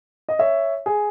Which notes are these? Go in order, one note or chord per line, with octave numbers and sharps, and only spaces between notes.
D#5
C#5 E5
G#4